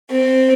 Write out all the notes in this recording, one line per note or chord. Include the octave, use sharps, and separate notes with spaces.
C4